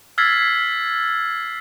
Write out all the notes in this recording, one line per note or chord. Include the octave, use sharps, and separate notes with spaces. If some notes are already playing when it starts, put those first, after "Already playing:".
E6 F6 G#6 A6 B6 C7